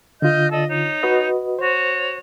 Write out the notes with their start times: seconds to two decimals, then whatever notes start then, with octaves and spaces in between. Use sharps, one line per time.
0.22 D3 F4 D#5 F6 G6
0.51 A4 D5 D#5
0.69 D#4 C#5
1.03 F#4 B4 D#5
1.59 F#4 C5 C#5